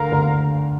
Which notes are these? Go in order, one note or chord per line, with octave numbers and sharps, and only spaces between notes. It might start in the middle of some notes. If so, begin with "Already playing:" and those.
Already playing: D2 D3 A#4 F5 A#5
D2 D3